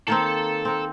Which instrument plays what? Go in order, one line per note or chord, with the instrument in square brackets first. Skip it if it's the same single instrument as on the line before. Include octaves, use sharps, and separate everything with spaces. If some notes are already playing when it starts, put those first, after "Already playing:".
[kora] D#3 A#3 C4 [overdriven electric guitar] A4
[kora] C4 A#4